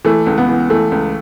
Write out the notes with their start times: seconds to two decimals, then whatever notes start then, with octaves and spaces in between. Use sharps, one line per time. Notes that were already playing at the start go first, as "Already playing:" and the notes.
0.05 E3 A3
0.27 C#2
0.38 B3
0.48 E3
0.70 E3 A3
0.92 C#2